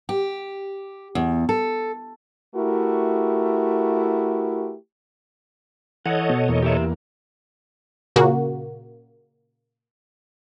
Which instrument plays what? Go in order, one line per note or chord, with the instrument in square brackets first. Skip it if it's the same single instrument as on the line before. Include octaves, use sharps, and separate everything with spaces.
[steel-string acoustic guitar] G4
E2
A4
[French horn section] A3 E4 F#4 G4 A#4
[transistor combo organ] E3 [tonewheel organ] A4 C#5 D#5 [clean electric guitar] F#5
[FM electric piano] B2
[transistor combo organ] E2 A#3
[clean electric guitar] G4 E5
[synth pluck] A#2 C#3 A#3 F#4